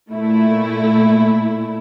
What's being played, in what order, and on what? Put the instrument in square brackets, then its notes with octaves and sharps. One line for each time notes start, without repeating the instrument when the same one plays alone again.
[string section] A#2 A3 E4